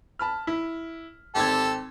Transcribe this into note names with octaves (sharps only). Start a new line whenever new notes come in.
A5 B5 F6
E4
G#1 C4 G4 A4 G#6